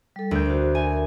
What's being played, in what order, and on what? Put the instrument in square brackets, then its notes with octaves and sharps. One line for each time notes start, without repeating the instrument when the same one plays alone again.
[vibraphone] G3 A4
[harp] D2 G6 [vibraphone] A#4
[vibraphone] F#4 C5
[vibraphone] A#4 E5 [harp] G#5